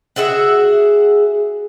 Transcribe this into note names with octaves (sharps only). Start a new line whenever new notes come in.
F#4 G#4 E5 F#5